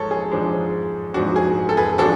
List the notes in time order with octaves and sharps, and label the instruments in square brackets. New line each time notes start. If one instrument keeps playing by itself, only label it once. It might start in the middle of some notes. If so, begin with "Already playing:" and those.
Already playing: [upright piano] G#2 F3 G#3 A4 C#5
G#4
G#2 F3 G#3 D4
G#2 F3 G#3 D4 F#4
G#4
A4
G#4 B4
F3 G#3 D4 F#4 A4